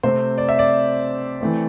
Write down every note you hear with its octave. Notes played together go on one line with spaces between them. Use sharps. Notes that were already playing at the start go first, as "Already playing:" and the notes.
C3 A3 C4 C5
D5
E5
D5
E3 A3 C4